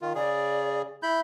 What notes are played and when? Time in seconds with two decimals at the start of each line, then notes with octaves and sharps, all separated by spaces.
0.01 D#3 F4
0.15 C#3 G#4 D5
1.03 E4 B5 G6